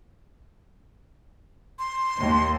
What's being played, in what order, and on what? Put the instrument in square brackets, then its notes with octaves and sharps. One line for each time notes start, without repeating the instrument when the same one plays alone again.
[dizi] C6
[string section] D#2